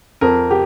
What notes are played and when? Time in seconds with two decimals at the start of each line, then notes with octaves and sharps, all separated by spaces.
0.21 F2 A#4
0.51 G4